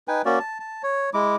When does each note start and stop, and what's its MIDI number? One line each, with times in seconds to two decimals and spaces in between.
0.08 0.22 63
0.08 0.22 71
0.08 0.22 79
0.08 0.22 80
0.25 0.39 58
0.25 0.39 61
0.25 0.39 66
0.25 0.39 74
0.40 0.59 81
0.60 0.82 81
0.83 1.10 73
1.14 1.36 56
1.14 1.36 64
1.14 1.36 86